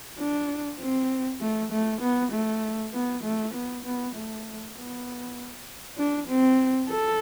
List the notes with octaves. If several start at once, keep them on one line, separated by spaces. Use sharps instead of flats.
D4
C4
A3
A3
B3
A3
B3
A3
B3
B3
A3
B3
D4
C4
A4